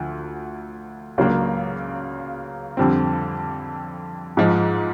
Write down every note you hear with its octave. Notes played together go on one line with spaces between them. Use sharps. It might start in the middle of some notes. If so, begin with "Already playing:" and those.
Already playing: D2 D3 F3
C#2 C#3 F#3 A#3 D4
F2 D3 G3 C4
G#2 F3 G#3